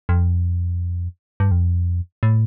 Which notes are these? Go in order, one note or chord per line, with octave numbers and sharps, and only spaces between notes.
F2
G2
F2
A2